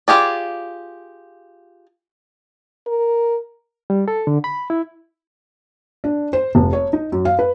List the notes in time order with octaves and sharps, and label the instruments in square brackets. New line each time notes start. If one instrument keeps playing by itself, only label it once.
[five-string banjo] F4 G4 G#4 D5
[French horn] A#4
[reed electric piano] G3
A4
D3
B5
E4
[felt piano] D4
C5
F1
C#5
D#4
F#2
F5
B4